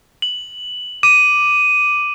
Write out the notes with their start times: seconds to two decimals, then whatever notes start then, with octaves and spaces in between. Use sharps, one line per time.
0.22 F#7
1.03 D6 D#7